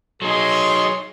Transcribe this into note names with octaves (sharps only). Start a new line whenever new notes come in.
F#3 D#4 G#4 C#5 C6